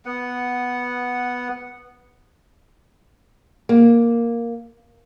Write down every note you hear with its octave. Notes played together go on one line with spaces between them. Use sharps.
B3 F#5
A#3